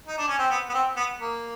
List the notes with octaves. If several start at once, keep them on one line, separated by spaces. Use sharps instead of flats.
D#4
D4
C#4
C4
B3
B3
C4
B3
A#3